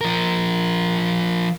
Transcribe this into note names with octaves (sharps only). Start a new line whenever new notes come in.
F3 A#4